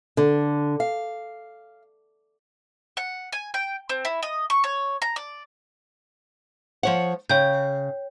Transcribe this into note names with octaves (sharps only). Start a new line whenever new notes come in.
D3
F5
F#5
G#5
G5
C4
E4
D#5
C#6
C#5
A#5
D5
F3 C#5 F#5
C#3 C#5 G5 G6